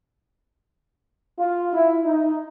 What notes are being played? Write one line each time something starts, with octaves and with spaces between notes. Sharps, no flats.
F4
E4
D#4